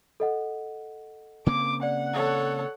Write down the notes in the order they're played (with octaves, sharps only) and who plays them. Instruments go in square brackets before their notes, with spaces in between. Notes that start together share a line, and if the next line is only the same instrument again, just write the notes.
[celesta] A4 D#5 F#5
[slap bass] C#3 A#3 C4 [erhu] D6
[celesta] D5 [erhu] F#5
[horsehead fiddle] A4 C#5